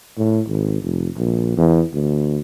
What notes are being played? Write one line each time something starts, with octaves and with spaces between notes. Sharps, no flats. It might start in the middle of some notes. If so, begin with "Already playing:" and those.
A2
G#1
F1
A#1
E2
D2